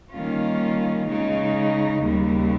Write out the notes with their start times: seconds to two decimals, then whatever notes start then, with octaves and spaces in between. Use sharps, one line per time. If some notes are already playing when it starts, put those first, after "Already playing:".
0.11 D#3 G3 A#3 C#4 F4
1.07 C#3 G#3 D#4
2.02 D#2 C#3 G3